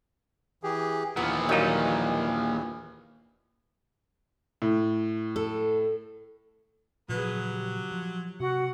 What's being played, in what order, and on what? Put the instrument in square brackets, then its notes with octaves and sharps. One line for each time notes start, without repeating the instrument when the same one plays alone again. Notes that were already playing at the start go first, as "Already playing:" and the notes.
[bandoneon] E3 G4 G#4
[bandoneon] D#2 E3 [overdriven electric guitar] A#2 F3 [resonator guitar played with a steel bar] B3
[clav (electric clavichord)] D#3 F#3 D#4 [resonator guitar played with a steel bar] G3 A#3
[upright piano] A2
[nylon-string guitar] A4
[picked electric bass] A#2 C#3 F3 [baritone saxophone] F#3 [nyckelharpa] G#4 B4
[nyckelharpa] G4
[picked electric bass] F3
[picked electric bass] C3 [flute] F#4 [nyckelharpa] F#5